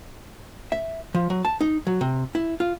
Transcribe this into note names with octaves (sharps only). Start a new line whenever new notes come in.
E5
F3
F#3
A5
D#4
F#3
C3
E4
F4